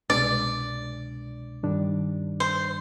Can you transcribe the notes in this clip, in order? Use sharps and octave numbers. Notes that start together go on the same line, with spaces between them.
C2 B2 G#3 D4 D5
G2 D#3 G3 D4
C5